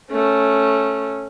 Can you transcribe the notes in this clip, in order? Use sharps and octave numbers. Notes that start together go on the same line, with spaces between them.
A3 C#4